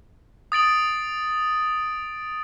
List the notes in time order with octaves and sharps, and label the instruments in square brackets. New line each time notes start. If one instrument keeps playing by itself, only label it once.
[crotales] D#6 A6 D7 F#7